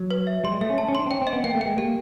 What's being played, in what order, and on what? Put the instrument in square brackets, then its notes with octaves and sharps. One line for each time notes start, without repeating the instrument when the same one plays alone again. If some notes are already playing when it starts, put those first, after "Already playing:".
Already playing: [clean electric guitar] F#3
[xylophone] B4
E5
[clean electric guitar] G3 [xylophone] C6
[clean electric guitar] G#3
[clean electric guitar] A3 [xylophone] E5
[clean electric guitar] C#4
[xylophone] A5
[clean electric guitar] C#4
[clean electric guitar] D4 [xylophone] C6
[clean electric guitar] C4
[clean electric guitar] C#4 [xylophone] G5
[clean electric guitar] C4
[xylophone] D#5
[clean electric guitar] B3
[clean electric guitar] A#3 [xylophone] G5
[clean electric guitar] A3
[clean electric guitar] G#3 [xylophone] G5
[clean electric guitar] A#3 [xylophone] G4